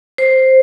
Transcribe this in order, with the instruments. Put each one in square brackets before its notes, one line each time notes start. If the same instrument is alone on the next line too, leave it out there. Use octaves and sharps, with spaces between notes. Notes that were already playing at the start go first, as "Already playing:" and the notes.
[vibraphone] C5